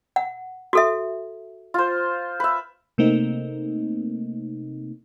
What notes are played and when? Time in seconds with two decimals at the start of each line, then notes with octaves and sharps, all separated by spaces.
0.16 F#5
0.73 F#4 A4 E5
1.74 F4 C5
2.40 B4 E5
2.98 C3 A3 A#3 C4 D#4